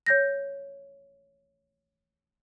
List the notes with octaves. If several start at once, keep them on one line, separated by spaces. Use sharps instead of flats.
C#5 G6 A#6